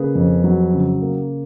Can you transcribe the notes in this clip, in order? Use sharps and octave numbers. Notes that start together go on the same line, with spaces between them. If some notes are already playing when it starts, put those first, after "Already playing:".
Already playing: C#3 A#3 G#4 B4
F2
F#3
C#3
A#3